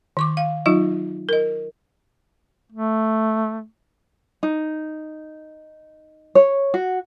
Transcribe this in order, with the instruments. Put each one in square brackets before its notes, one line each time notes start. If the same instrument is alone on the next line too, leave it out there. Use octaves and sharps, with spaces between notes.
[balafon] D#3 C#6 D6
F5
F#3 D#4 F4 D#5
A#4 D#5
[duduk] A3
[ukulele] D#4
C#5
F#4